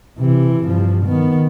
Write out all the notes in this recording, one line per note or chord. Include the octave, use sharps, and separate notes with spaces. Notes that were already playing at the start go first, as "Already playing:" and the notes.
C3 E3
G2 F3
D#3 B3